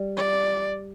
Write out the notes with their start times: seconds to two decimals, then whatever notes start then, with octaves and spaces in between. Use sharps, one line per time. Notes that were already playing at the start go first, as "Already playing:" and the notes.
Already playing: G3
0.17 D5